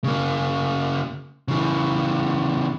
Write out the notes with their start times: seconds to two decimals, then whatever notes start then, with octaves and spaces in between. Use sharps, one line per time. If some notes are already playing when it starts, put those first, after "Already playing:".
0.04 C#3 A#3
1.48 C#3 E3